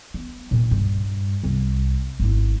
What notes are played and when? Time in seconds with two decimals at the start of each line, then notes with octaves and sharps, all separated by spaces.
0.14 B3
0.51 A#2 D#3
0.71 G2
1.44 C2
2.20 G#1 E4